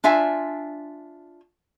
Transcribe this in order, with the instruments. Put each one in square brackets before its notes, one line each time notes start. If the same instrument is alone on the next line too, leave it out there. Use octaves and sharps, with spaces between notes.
[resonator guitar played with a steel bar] D4 F4 E5 G#5